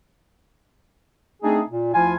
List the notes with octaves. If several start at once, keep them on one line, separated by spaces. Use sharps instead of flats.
A3 C4 D4 D#4 G#4
A#2
D2 F3 E4 F4 G#5